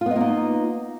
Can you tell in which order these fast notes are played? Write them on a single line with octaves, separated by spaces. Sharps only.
F4 B3 D#5 A#3 D#4